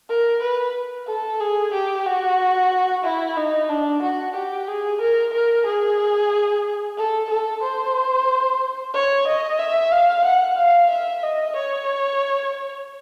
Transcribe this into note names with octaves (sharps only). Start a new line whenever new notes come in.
A#4
B4
A4
G#4
G4
F#4
E4
D#4
D4
F#4
G4
G#4
A#4
A#4
G#4
A4
A4
C5
C#5
D#5
E5
F5
F#5
F5
E5
D#5
C#5